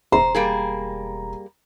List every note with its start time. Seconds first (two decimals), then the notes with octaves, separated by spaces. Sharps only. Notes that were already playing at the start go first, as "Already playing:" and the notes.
0.12 E1 C5 A#5
0.35 G3 A#3 G#4